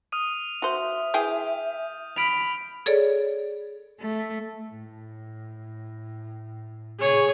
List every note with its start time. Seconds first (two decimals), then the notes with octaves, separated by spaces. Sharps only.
0.12 D#6 F6 D#7
0.62 F#4 C5 E5
1.14 E3 G#4 G5 G6
2.16 B5 F6 D7 F7
2.86 G#4 A4 C#5 D5
4.01 A3
4.69 A2
7.00 A#2 C#3 G#4 C#5